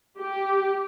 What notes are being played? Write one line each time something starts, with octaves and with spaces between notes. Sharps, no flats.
G4